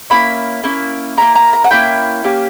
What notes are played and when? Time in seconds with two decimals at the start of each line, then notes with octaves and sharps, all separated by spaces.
0.10 A#3 C#4 E4 B5
0.64 A#3 C#4 E4
1.17 A#3 C#4 E4 A#5
1.35 A#5
1.53 A#5
1.64 F#5
1.71 A#3 C#4 E4 G5
2.24 A#3 C#4 G4